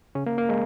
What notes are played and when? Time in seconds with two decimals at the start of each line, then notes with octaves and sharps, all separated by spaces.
0.15 C#3 C#4
0.26 A#3
0.38 A#3
0.49 G#3